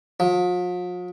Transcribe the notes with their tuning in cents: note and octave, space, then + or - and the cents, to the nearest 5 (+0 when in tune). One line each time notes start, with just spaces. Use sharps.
F3 +45